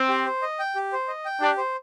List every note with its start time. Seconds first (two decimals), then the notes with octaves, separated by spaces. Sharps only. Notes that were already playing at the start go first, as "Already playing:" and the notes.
Already playing: C4
0.09 G4
0.25 C5
0.42 D#5
0.59 G5
0.76 G4
0.93 C5
1.08 D#5
1.25 G5
1.41 D4 G4
1.57 C5